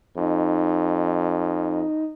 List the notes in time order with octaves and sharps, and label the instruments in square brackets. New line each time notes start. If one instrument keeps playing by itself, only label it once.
[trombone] F2 [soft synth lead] D#4